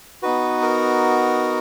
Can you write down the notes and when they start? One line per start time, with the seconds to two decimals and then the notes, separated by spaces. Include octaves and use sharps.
0.22 B3 D#4 F#4 B4
0.62 A#4